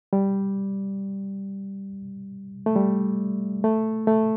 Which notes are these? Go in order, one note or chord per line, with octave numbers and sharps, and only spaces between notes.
G3
A3
G3
A3
A3